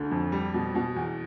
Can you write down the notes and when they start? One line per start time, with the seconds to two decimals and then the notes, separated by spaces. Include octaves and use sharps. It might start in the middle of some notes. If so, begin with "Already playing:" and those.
Already playing: D2 D3
0.11 F2
0.32 G3
0.54 B2
0.75 B2
0.96 E2